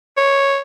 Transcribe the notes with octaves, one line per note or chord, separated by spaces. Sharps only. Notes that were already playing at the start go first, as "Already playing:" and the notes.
C#5